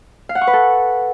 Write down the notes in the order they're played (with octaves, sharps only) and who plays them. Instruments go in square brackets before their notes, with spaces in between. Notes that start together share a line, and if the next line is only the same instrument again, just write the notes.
[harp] F5
F#5
C#6
B4
A4